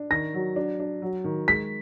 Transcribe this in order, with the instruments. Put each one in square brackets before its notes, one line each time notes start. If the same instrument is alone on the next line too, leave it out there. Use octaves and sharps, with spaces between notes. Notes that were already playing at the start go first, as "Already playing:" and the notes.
Already playing: [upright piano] D4
[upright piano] D#3 [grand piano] A#6
[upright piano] F#3
D4
D4
F#3
D#3
[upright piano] G#3 [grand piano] B6